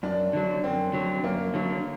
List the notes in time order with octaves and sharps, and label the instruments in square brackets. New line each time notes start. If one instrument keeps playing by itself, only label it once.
[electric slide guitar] F#2 [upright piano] D4
[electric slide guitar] D3 F#3
[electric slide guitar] F#2 [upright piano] C4
[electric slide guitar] D3 F#3
[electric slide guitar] F#2 [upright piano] A#3
[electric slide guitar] D3 F#3